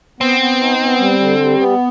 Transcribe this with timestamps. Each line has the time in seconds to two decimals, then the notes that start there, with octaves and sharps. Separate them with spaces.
0.20 B3 C4
0.40 B3
0.60 D#4
0.80 B3
1.00 G3
1.20 D3
1.40 G3
1.59 B3